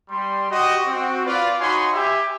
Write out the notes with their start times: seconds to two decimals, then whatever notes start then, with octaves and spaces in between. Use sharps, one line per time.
0.10 G3 C6
0.50 F#4 G4 D#5
0.86 C4 F#4
1.26 F4 B4 D5
1.60 D#4 F#4 C#5 G#5 B5 C6
1.93 G4 E5 G#5